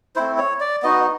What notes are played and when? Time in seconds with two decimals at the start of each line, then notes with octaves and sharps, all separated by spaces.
0.16 A3 C4 E4 C5
0.38 C#5
0.60 D5
0.83 B3 D#4 F#4 D#5